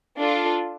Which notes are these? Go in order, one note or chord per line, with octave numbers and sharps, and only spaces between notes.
D4 F4 A4